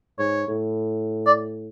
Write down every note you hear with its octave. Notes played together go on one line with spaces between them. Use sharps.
G#2 C#5
A2
D5